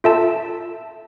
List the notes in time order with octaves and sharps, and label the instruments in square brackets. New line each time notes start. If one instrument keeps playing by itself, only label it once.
[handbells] F4 A4 E5 A5